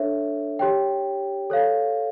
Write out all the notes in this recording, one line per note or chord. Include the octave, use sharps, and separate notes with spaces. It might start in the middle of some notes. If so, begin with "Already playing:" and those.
Already playing: D4 A4 C#5 E5
G4 C#5 G5
A4 C#5 F5